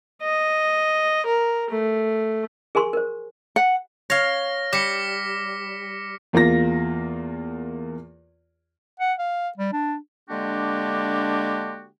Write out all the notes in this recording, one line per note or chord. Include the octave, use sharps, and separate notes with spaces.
D#5
A#4
A3
G#4 A#4 G#5 C6 C#6
A#4 C5
F#5
C#5 F5 F6 A#6
G3 D6 B6 C#7
E2 A#3 F4 A#6
F#5
F5
G3
D4
D3 G#3 A#3 D4 F#4 G4